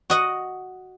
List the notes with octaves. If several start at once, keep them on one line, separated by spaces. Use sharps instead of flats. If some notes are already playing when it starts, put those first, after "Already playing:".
F#4 D#5 F#5